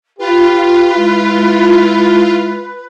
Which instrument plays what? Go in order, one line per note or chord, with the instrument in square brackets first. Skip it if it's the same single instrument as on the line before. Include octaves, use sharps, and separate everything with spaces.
[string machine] F4 [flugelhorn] G4 [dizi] B4
[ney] G#3 [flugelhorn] E4